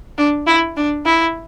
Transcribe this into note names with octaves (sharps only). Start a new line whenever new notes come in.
D4
E4
D4
E4